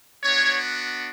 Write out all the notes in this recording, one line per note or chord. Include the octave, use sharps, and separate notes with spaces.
B3 D4 F#4 C#5